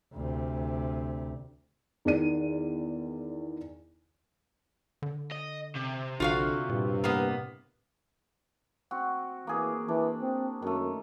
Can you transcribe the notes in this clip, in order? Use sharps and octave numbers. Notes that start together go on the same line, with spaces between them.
D2 C3
E2 D#3 D5 D#7
D3
D#5
C3
A#1 D3 F4 F#4 F5
G2 A#2
A2 A#3 B3
C4 F#4
E3 A#3 G#4
E3 D4
C4
F#2 D#3 A3